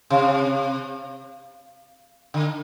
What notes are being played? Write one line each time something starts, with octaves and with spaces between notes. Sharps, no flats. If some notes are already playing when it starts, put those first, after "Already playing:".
C3
D3